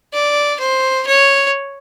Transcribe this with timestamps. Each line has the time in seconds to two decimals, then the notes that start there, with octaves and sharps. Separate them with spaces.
0.13 D5
0.59 C5
1.06 C#5